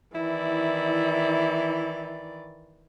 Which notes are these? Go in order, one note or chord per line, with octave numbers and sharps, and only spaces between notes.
D#3 E3 E4 D5